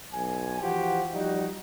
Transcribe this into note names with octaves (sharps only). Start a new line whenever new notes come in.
B1 G#5
E3 F3 F#4 G4 C5
F3 G3 D#4 F#4